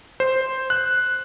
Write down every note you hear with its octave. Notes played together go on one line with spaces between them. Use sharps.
C5
F#6